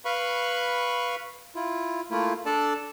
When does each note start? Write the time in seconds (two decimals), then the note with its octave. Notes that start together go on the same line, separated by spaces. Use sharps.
0.05 B4 F5 B5 C#6
1.55 E4 F4
2.11 A3 A#3 E4 F4
2.46 D4 A4 D5 A5